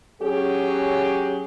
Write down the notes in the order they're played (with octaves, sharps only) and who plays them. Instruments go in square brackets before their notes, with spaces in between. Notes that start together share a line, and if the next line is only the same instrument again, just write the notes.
[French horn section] F#3 C#4 G4 G#4